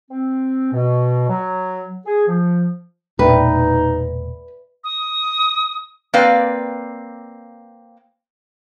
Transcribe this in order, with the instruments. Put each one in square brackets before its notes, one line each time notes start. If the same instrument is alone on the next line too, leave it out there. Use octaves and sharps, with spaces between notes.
[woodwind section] C4
B2
F#3
G#4
F3
[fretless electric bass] E1 A#2 [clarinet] D#4 [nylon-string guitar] B4 [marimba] D5 E5 G5
[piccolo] D#6
[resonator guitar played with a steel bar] A#3 C4 B4 D5 F5